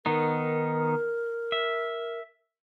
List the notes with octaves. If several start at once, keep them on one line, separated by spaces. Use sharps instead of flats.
D#3 B3 D#4 A#4
E5